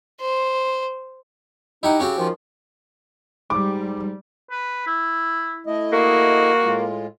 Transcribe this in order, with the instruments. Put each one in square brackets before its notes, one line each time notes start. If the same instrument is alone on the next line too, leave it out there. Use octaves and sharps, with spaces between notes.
[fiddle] C5
[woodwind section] D#4 [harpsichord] E4 G4 F#5
[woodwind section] C#3 C4 [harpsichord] C#4 F#4 G4
[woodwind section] D#3 F3 F4
[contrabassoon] G#2 [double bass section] G3 [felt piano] D6
[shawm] B4
E4
[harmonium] A3 E4 D#5
[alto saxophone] A#3 [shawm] F#4
[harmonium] A2 G#3 F4